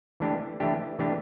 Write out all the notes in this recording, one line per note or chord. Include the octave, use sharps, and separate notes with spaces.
E3 A3 D4 G4
E3 A3 D4 G4
E3 A3 D4 G4